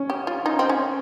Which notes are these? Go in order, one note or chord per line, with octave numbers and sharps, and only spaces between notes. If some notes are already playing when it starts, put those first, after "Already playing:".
Already playing: C#4
G4
F4
D#4
C4
C#4